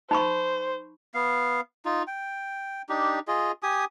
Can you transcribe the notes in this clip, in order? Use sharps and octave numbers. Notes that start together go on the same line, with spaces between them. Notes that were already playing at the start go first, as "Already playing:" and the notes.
D#4 C5 B5 C#6
B3 F5
D#4 F4
G5
D4 D#4 G4
F4 G#4 D#5
G4 G#5 D#6